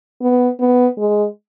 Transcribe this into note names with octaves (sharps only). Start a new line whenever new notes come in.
B3
B3
G#3